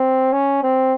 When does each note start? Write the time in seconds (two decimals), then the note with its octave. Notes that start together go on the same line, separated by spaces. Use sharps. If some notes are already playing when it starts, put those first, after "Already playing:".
Already playing: C4
0.33 C#4
0.63 C4